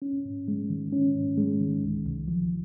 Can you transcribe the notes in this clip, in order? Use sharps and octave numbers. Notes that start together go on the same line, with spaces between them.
C#4
G#2
G#3
D#3
C#4
G#2
G#3
D#3
C2
C2
F3